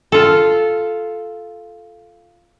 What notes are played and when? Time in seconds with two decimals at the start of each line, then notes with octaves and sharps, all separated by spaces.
0.12 F4 A4